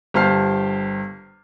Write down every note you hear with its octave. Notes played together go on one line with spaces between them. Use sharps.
G1 G4 C5 A5 F6 C7